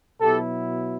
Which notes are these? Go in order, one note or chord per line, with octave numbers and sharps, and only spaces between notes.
B2 F#3 B3 E4 G4 A4